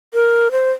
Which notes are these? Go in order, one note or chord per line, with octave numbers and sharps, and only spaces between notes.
A#4
C5